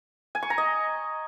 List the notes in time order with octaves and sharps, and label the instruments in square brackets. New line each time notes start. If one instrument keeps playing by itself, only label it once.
[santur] G#5
C#6
A#5
D#5